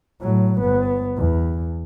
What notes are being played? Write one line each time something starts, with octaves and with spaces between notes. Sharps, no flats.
A2 F#3
G1 B3
E2